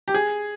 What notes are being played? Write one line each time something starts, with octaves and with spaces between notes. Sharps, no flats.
G4
G#4